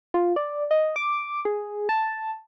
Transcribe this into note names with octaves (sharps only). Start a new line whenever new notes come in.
F4
D5
D#5
D6
G#4
A5